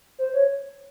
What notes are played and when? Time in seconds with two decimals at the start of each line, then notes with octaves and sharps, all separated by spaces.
0.19 C5
0.33 C#5